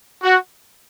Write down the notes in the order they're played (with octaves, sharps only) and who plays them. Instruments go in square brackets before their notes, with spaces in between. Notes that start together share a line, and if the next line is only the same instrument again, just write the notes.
[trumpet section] F#4